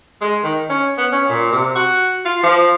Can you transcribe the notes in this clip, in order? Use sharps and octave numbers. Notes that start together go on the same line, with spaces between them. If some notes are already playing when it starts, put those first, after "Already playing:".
G#3
D#3
C#4
B3
C#4
A#2
C3
F#4
F4
F3